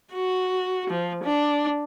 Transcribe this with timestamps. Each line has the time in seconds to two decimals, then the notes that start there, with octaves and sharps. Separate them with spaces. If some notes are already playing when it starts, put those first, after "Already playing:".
0.13 F#4
0.90 F3
1.24 D4